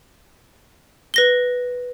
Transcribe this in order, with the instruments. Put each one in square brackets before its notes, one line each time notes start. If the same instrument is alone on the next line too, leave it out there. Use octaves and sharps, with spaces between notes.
[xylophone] B4 A#6 G7